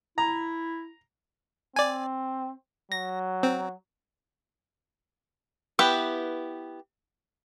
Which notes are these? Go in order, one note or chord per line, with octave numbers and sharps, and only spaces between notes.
E4 A#5
C4 D5 G#5
F#3 A#6
C4
B3 E4 G4 B4